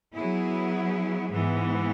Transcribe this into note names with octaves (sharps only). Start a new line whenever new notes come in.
F#3 B3 E4 G#4
G#2 E3 B3